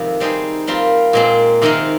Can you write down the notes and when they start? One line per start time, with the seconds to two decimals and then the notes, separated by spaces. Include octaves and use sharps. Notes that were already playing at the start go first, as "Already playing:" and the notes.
Already playing: F2 C3 D#3 G#3
0.20 G3 C4 D#4 G#4
0.67 G3 C4 F4 A#4
1.13 A#2 G#3 C4
1.62 C3 D#3 G#3 D#4 A#4